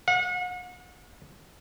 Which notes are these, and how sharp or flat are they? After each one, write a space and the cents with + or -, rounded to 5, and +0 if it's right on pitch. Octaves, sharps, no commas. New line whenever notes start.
F#5 -40